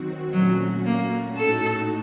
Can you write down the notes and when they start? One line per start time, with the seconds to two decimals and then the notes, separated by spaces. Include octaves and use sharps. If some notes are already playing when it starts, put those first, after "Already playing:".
Already playing: D#3 F#3 C4 F#4
0.33 A#2 F#3 A3 C#4 F#4
0.86 A#3
1.37 A2 A3 D#4 F#4 A4